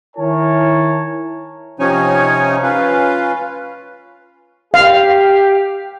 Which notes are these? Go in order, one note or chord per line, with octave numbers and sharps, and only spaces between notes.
D#3 E4 A#4 C#5 G#5 A5
C3 F3 C#4 D#4 C#5 G#5
C#4 F4 B4 F5
G4 F5